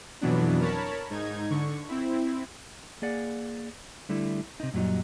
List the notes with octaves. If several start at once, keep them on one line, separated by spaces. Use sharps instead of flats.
F2 B2 E3 F#3 B3 D4
A#4 C#5 A5 B5
G#2 D#4 G#6
D3 C#6
C4 E4
A#3 G#4 D5 F#5
D3 G3 A3 E4
C3 D#4
F#2 A#2 F#3 G3 D#4